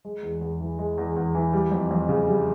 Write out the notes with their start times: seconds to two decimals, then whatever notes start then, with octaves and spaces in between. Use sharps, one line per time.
0.05 G#3
0.23 E2
0.41 E2
0.60 E3
0.79 G#3
0.98 E2
1.16 E2
1.35 E3
1.53 G3
1.72 F2
1.91 F2
2.09 C#3
2.28 G3